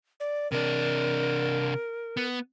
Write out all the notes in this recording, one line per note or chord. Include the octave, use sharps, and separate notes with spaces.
D5
C3 D4 A#4
B3